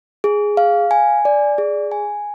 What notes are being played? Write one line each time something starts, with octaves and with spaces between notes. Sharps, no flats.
G#4
F5
G#5
D5
G#4
G#5